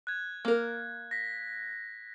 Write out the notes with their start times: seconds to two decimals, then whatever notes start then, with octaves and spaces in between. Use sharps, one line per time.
0.07 F#6 G#6
0.45 A#3 A#4
1.11 A#6 B6